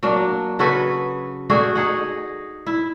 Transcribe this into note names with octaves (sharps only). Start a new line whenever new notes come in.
F#3 A#3 D4
C#3 F#4 A4 B4
A3 D4 F#4 G#4
D#4 G#4 F#5
E4